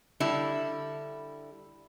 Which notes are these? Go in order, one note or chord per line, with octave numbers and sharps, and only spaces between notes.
D3 G3 E4